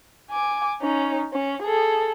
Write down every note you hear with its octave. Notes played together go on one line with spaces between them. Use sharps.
G#5 D6
C#4 D#4
C#4
G#4 A4